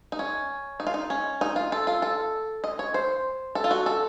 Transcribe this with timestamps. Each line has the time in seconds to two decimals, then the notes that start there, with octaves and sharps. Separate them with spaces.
0.12 D#4
0.19 C#4
0.80 D#4
0.87 F4
0.94 D#4
1.10 C#4
1.41 D#4
1.56 F4
1.72 A4
1.87 F4
2.02 A4
2.64 D#5
2.79 C#5
2.94 C5
3.55 A4
3.64 F4
3.71 F#4
3.86 A4